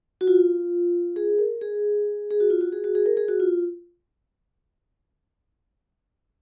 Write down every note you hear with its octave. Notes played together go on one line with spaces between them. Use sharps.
F#4
F4
G#4
A#4
G#4
G#4
F#4
F4
F#4
G#4
F#4
G#4
A#4
G#4
F#4
F4